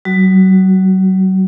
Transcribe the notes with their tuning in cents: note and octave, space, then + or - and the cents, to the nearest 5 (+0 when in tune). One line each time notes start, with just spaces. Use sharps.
F#3 +35 F#4 +0